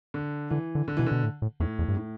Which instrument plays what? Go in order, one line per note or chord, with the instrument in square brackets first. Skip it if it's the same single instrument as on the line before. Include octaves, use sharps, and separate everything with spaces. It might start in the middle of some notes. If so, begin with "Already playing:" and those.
[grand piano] D3
[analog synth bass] D3 [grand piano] E3
[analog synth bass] D3
[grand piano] D3
[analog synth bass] B2 [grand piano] E3
[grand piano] D3
[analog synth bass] B2
A2
A2
[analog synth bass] E2 [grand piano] A2
[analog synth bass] E2
G2
[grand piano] A2